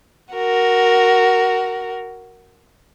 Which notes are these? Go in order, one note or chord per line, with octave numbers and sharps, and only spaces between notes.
F#4 A#4